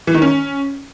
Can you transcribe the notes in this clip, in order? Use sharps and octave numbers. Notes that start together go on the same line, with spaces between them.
E3
D#3
C#4